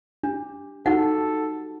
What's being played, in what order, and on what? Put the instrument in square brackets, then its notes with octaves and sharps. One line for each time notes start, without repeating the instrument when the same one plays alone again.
[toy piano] D4 [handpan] G4
[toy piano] D#4 F#5 [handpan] F#4 G4 [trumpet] A4